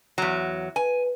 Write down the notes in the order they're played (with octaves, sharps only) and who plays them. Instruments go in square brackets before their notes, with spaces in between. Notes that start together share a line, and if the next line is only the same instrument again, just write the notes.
[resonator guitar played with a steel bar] E2 F#3
[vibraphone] B4 [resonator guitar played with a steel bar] G#5